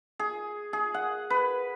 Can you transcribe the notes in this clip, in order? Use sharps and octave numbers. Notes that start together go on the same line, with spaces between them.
G#4
G#4
F#5
B4